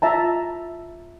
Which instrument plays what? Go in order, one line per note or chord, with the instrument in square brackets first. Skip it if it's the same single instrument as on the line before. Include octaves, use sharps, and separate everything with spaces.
[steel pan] F4 E5 A5 A#5